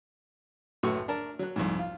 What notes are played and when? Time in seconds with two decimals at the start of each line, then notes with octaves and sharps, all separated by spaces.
0.83 B1 F#2 A2 F#4 C#6 E6
1.08 D4 A#4 A5
1.39 F#3 F#6
1.56 C2 F2 G#2
1.79 F4